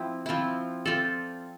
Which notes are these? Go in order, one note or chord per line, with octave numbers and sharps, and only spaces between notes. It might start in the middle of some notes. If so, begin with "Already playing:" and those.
Already playing: F3 C4 E4
F3 C4 E4
C4 F4 A4 D5